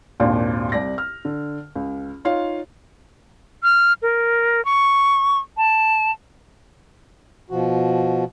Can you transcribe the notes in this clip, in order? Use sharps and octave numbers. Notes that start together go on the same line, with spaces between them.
G#1 D#2 A#2 D4
C2 D5 A#6
F6
D3
C#2
D#4 F4 C#5 F5
F6
A#4
C#6
A5
B2 F3 F#4